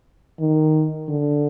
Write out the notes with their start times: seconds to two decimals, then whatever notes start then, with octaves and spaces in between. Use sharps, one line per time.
0.40 D#3
1.09 D3